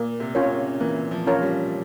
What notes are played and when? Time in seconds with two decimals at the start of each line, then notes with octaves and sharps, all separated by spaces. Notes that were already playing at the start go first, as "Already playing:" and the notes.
Already playing: A#2 A#3
0.20 C3
0.35 C#4 F4 A#4 C#5
0.42 C3
0.51 C#3
0.80 E3 A#3
1.11 F3
1.27 C#4 F4 A#4 C#5
1.42 G3